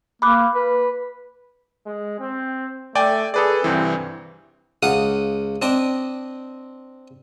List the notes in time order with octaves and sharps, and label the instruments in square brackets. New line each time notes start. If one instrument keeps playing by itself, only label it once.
[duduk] A#3 [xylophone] B5 D6 F#6
[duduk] B4
[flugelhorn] G#3
C4
[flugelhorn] A3 [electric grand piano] D5 G5 G#5
[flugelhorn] G#4 [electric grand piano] A4 B4 D5
[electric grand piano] C2 G2 E3 [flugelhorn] C4
[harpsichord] C#2 F5 F#5 D#6
C4 D4 D#5 D6